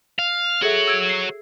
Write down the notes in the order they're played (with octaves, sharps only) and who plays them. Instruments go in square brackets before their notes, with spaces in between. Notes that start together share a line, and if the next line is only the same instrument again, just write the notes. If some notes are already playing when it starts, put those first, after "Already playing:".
[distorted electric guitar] F5
[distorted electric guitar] F#4 C#5 [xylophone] G#4 A4 E5
[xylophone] E6 G#6 D7
C7